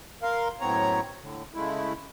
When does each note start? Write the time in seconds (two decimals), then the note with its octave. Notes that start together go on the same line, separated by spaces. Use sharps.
0.22 A#4 F5 C6
0.60 F#2 A2 B3 C4 C#5 A#5
1.22 A2 D3
1.54 C#3 G#3 A3 E4